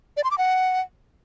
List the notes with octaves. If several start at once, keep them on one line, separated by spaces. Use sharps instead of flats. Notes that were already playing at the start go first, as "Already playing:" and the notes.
D5
C6
D6
F#5